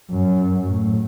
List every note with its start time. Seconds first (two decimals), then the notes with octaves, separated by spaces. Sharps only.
0.11 F#2
0.68 A2